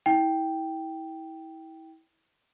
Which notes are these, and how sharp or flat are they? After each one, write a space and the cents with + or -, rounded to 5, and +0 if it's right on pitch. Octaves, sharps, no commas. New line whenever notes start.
E4 -30 G5 +0